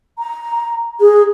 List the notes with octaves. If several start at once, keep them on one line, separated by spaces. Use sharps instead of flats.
A#5
G#4